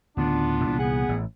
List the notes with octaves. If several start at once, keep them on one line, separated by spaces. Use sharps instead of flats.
D1 D2 C#3 B3 D4 F4
C2 A#2 E3
B3 G#4 F#5
A1 A2